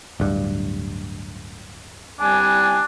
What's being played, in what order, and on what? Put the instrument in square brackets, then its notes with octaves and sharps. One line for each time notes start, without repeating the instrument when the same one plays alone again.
[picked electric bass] D1 G2
[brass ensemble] C2 G3 G#5 [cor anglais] D4